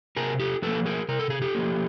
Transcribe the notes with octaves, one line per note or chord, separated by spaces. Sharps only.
C3 G#4 A#4
G4 A4
F3 A#3 A4 B4
G#4 A#4
C3 A#4
A4
G#4
G4 A4
F3 A#3